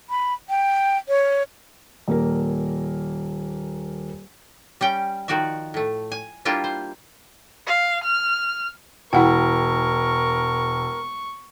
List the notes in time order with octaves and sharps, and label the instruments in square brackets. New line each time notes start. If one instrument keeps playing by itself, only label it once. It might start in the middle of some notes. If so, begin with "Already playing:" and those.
[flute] B5
G5
C#5
[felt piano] D#1 A#3 A#4
[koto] G3 C#4 G5
D#3 F3 F#4 D5 E5
A2 A3
G#5
G3 A#3 D4 E4 F4 G4
C5
[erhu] F5
F6
[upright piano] E1 [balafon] E4 F#5 G5 [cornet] A#4 [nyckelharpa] C#6